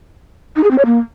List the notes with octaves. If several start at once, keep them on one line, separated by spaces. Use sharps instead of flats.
D#4
G#4
C4
C#5
A#3